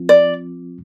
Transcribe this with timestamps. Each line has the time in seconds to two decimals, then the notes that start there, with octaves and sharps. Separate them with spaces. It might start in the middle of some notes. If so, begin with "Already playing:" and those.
Already playing: F3 C4 F4
0.09 D5